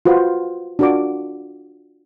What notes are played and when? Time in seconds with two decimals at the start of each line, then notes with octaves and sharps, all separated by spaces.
0.05 F4 F#4 B4 C5 C6
0.79 D4 F4 F#4 A#4 D5 D6